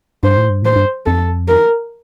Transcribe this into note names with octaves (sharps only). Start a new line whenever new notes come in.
G2 C5
A2
G2
A2 C5
G2
F2 A4
A#4